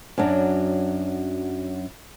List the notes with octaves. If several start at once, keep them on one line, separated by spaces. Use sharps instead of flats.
F#2 F#3 D4